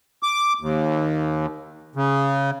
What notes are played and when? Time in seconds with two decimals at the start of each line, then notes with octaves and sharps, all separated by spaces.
0.23 D6
0.61 D#2
1.95 C#3